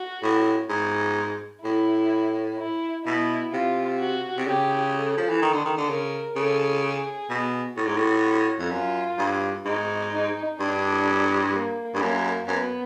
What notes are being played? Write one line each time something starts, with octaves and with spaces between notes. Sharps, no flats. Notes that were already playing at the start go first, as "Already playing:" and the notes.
Already playing: F#4
A2
G#2
A2 E4
E4
B2 E4
C3 F4
F#4
C3
C#3 G4
A4
F3
E3
D#3
D3
D#3
D3
C#3 A#4
C#3 A4
G#4
B2
A2 F#4
G#2
A2
F2
F#2 F4
G2
G#2 D#4
D#4
G2 D4
A#3
G2
F#2 A#3
F#2 B3